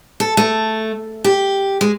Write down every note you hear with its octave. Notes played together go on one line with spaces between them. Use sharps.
A4
A3
G4
G#3